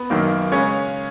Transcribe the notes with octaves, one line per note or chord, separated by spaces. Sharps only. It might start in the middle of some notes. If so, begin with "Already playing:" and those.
Already playing: B3
F#2 D#3 F#3 A#3
C#3 G#3 C#4 C#5